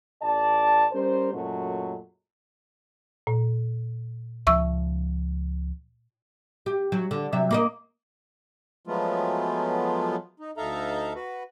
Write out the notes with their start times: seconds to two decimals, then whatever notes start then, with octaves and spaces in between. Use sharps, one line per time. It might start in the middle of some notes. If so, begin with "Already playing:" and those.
0.21 A1 D5 A5
0.92 G3 C#4 A#4 C5
1.33 F#2 A#2 F#3 G#3 A3 C#4
3.27 A#2
4.47 C#2 F3 E5 C#6 E6
6.66 G4
6.92 F#3
7.11 D3
7.33 C3 F#3 E5
7.51 A#3 A#4 D#5
8.87 F3 F#3 G#3 A3 B3 F4
10.40 D#4
10.57 D2 D#4 A4 E5 F5 A#5
11.15 F#4 B4